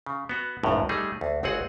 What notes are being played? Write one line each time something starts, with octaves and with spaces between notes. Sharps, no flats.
C#3
B3 F#4
G#1 C#2 F#2 A2
G3 A3 D#4 G#4
D2
G1 C#2 C4 F#4 G#4 F#5